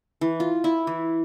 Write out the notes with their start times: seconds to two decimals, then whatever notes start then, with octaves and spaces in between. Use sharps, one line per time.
0.21 E3
0.40 F4
0.64 E4
0.87 E3